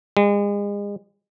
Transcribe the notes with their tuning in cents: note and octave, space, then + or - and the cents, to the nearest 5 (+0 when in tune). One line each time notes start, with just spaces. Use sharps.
G#3 -35